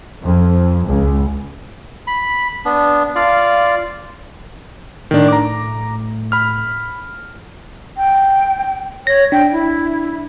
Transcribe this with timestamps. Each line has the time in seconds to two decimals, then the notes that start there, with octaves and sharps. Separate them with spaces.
0.22 F2
0.85 C#2
2.07 B5
2.65 B3 D4
3.15 F4 D5 F5
5.11 A2 D#3 D4
5.28 A2 A#5 D6
6.32 B5 F6
7.97 G5
9.07 C#5 A#6
9.32 D4 G5
9.52 E4